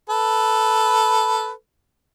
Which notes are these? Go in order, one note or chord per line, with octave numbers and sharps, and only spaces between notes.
A4 B4